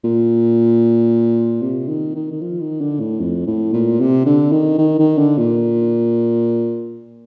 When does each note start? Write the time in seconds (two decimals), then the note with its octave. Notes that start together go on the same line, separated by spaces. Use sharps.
0.04 A#2
1.61 C3
1.88 D#3
2.15 D#3
2.31 D#3
2.41 F3
2.60 D#3
2.81 D3
3.00 A2
3.20 F2
3.47 A2
3.73 A#2
4.00 C3
4.26 D3
4.52 D#3
4.78 D#3
4.99 D#3
5.18 D3
5.38 A#2